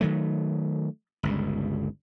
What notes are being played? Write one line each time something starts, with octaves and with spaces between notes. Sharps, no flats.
D#3 F#3 A3
G1 C#2 G2